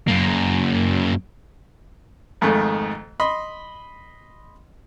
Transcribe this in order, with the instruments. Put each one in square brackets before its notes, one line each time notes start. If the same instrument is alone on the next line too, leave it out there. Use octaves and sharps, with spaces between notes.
[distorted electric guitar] F#2 A#3
[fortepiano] F2 G#2 D#3 A3
D#5 B5 C6